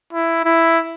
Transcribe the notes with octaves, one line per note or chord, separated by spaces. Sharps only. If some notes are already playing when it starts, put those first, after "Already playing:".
E4
E4